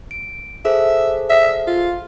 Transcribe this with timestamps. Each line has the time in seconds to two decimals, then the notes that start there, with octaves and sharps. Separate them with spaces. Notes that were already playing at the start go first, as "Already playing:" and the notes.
0.11 D7
0.65 G#4 A4 C5 E5
1.30 E5
1.67 F4